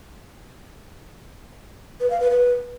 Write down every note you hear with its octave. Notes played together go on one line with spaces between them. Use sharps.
B4
F5
B4
B4